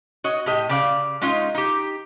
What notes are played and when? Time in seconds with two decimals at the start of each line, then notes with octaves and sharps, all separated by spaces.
0.24 F#4 C#5 D#5
0.46 A2 G4 D#5
0.69 C#3 D5 F5
1.21 G#3 C#4 D#4 F4
1.55 D#4 G4